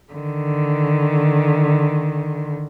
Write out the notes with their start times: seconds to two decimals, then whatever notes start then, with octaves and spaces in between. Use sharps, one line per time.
0.13 D3 D#3